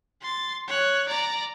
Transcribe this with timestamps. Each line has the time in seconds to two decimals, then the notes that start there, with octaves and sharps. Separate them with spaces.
0.22 C6 A6
0.68 C#5 F#6
1.08 D5 A#5